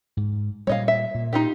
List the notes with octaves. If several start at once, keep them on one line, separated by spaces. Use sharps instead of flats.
G#2
A#2 G3 C#5 D#5 F5
E5
A#2
D#4 F4 G4